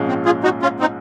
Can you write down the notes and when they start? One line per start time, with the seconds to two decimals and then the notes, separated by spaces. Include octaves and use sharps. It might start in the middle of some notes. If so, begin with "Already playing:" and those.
Already playing: A#1 G#2 F3 G#3 C#4
0.08 C4
0.25 F4 G#4
0.43 D#4 F#4
0.62 C#4 F4
0.80 C4 D#4